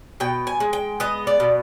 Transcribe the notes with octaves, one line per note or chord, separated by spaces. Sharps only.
B2 G5
G#5
G#3
G5
B3 D#5
D5
B2